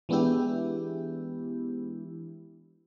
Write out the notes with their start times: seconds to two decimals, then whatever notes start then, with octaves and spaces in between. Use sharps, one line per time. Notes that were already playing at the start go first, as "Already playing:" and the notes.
0.09 E3 G#3 B3 D4 E4 G4